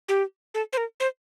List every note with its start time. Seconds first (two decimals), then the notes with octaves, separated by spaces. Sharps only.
0.09 G4
0.54 A4
0.73 C5
0.77 A#4
1.00 C5